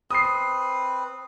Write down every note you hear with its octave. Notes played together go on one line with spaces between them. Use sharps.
C4 B4 D#6 C7